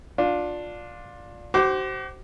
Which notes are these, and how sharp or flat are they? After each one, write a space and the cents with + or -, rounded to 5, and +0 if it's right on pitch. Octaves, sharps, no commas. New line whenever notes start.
D4 +0 F4 +20
F#4 +45 C5 +0 D6 +0